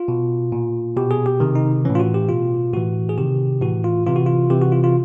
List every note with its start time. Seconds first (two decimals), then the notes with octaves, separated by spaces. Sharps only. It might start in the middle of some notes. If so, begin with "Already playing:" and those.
Already playing: F4
0.08 B2
0.52 A#2
0.97 B2 G4
1.11 G#4
1.26 G4
1.40 C3 D#3
1.55 D#4
1.85 A2 E3 C#4
1.95 F4
2.00 F#4
2.14 G4
2.29 B2 F4
2.73 A2 E3 F#4
3.09 G#4
3.17 C3 D#3 G4
3.61 A2 E3 F#4
3.84 F4
4.06 C3 E3 F4
4.16 F#4
4.26 F4
4.50 C3 E3 G4
4.62 F#4
4.72 F4
4.84 F4